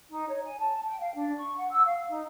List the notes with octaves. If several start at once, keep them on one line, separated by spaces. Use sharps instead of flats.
D#4
C#5
G#5
A5
G5
F5
D4
C#6
F#5
E6
F5
D#4